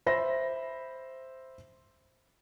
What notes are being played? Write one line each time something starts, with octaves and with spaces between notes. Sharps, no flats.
C5 E5 B5 A#6